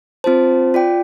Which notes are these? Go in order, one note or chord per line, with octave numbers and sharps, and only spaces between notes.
C4 F4 C5 A5
F4 D5 G5